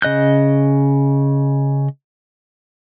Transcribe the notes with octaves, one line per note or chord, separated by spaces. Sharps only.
C#3 D#5 F#6 G6